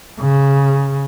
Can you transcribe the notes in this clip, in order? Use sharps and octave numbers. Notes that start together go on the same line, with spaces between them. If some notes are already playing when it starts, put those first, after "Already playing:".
C#3